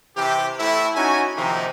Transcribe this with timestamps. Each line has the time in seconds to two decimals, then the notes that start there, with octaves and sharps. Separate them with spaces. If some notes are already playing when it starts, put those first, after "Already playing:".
0.17 C3 E3 G4
0.59 A2 E4
0.95 C#4 D#4 F#4 G#5
1.37 C3 D#3 F3 A#3 D#4